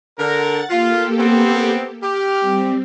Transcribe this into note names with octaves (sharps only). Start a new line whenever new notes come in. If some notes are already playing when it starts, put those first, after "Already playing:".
D3 A#4 F#5 A6
A#3 F4 G4 A4
B3 C4
G4 F6
G3 C4